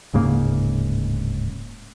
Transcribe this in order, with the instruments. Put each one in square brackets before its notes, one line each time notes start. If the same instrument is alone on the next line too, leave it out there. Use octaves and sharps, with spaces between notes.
[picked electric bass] D1 G#2 C#3 A#3